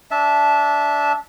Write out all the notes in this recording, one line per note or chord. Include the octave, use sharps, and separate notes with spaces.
D4 E5 A5